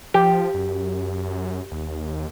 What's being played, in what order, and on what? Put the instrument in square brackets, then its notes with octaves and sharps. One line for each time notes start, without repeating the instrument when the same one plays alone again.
[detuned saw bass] F3 [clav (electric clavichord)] G4
[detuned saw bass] F#2
D#2